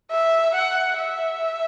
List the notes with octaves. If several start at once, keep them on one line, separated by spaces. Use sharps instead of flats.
E5
F#5
E5